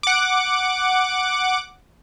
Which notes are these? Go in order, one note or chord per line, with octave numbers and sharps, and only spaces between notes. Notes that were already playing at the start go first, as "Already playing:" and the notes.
F#5 D6